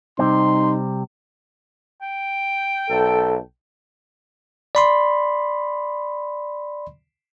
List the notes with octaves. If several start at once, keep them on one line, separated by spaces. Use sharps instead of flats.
C3 G3 C4 D#4 C6
G5
B1 A4
D5 B5 C6